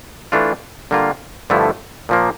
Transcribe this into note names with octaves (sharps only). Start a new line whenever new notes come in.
E3 A3 D4 F4
D3 G3 A#3 F4
G2 D3 F3 A3 E4
A#2 F3 A#3